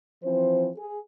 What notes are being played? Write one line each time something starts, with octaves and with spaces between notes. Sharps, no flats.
E3 F3 C4 C5
G#4